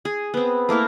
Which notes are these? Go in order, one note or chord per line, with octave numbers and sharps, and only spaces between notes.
G#4
B3 C4
A3 A#3 E4 A#4